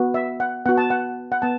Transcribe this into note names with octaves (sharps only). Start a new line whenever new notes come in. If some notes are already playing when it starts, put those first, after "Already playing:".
Already playing: B3 F#4
E5
F#5
B3 F#4 F#5
A5
F#5
F#5
B3 A5